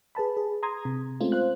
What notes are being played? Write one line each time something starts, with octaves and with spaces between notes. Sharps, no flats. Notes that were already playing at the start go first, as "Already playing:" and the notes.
G#4 B4 A5 B5
G#4
A#5 C6 D#6 G#6
C3
G#3 A3 C4 C#4 F4
C5 F5 F#6